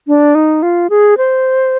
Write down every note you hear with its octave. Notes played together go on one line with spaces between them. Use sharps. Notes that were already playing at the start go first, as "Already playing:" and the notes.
D4
D#4
F4
G#4
C5